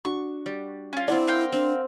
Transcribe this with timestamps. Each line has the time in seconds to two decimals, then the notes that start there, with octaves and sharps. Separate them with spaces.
0.05 D4 F#4 C#6
0.46 G3
0.93 C#4 F4
1.08 C4 D4 E4 D5 F#5 C6
1.27 A#4 F5 G5
1.52 C4 D4